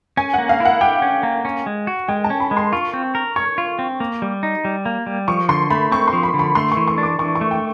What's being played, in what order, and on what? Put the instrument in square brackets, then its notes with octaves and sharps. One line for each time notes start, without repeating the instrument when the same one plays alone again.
[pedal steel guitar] C#4 [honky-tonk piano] G#5
[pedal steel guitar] A#3 [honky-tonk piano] F#5
[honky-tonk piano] F5
[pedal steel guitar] E4
[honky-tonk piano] F#5
[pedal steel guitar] G4 [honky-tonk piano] G5
[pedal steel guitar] C#4
A#3
C#4
G#3
F#4
[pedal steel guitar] G#3 [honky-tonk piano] G5
[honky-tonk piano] A5
[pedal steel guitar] C#4
[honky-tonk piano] B5
[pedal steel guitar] G#3
[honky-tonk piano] C6
[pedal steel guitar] F4 [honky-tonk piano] C#6
[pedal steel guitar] C4
A#4
[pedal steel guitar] C#5 [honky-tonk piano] C#6
[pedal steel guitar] F4
C4
A#3
G3
D#4
G3
A#3
G3
[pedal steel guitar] F3 [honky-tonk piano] C#6
[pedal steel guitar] D3 [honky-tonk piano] C6
[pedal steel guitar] A3 [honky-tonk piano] B5
[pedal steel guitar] C4 [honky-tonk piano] C#6
[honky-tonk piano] C6
[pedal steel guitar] F3
[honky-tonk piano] B5
[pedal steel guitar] D3
[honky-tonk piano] B5
[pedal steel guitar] A3 [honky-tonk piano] C6
[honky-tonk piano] C#6
[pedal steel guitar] E3
[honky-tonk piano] C#6
[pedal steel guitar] D4
[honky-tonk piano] D6
[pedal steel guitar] E3 [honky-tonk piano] C#6
[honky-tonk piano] C#6
[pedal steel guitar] A3
[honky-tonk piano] G5